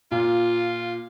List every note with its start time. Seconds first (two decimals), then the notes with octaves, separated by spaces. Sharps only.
0.12 A#2 F4